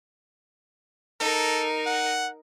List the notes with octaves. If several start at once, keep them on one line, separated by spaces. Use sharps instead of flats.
D#4 A4 A#4
F#5